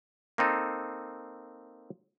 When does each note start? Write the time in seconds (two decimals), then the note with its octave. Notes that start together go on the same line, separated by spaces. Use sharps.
0.38 A#3 C4 D#4 A4